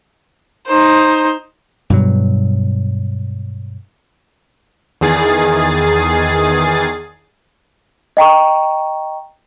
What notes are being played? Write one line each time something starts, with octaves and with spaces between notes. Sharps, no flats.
D#4 C5
G2 B2 F#3
E2 D#3 G#4 A6 C7
D#5 G5 A#5 C#6